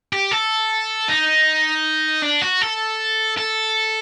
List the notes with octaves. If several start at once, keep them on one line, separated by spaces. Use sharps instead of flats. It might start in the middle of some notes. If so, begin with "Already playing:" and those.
G4
A4
D#4
D4
F#4
A4
A4